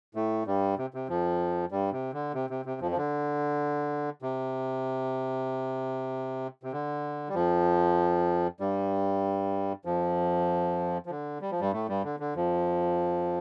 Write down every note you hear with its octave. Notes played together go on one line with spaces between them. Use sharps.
A2 A3
G2 G3
C3
C3
F2 F3
G2 G3
C3
D3
C3
C3
C3
F2 F3
F3
D3
C3
C3
D3
G3
F2 F3
G2 G3
F2 F3
F3
D3
G3
F3
G2 G3
A2 A3
G2 G3
D3
D3
F2 F3